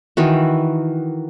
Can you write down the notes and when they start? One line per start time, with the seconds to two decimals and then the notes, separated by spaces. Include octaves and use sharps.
0.17 D#3 E3 F#4